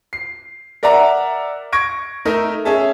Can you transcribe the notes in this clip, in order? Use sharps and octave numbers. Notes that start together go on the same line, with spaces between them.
C7
A#4 D5 E5 F#5 A#5
C#6 G#6 A#6 D7
A3 D#4 A#4 E5
C#4 G#4 E5 A5